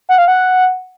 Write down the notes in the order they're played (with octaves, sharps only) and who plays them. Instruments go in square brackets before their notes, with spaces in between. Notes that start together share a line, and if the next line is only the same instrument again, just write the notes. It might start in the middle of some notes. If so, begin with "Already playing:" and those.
[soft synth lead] F#5
F5
F#5